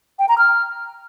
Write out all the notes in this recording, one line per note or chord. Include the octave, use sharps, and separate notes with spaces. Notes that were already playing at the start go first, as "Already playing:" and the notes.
G5
A#5
F6